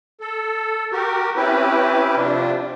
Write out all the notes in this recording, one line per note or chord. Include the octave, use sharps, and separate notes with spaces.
A4
F#4 G4 A#4
C4 C#4 E4 G4 B4
C3 F3 D4